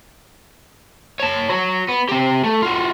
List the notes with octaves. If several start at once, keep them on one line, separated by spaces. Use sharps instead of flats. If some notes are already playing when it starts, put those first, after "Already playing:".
C#5 A5
F#4 C#5
B3
C4 G4
A3
F4 F#4